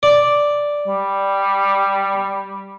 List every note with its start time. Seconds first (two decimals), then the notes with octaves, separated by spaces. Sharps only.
0.03 D5
0.87 G3